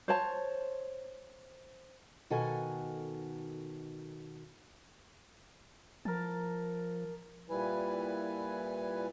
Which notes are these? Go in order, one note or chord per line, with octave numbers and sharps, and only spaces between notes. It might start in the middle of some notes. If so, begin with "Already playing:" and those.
C5 C#5 A5
B2 D#3 F#4 A4 F#5 G#5
F3 A#4 A5
A#2 G3 E4 B4 G#5